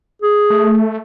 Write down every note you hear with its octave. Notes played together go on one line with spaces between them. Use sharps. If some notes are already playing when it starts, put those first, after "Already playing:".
G#4
A3